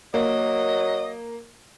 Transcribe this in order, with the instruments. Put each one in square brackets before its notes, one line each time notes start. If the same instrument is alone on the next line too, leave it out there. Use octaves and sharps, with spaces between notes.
[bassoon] F#3 [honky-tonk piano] A#3 [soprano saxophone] D#5